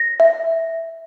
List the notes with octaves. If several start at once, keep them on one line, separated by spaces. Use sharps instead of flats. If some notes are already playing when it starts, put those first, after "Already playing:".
Already playing: A#6
E5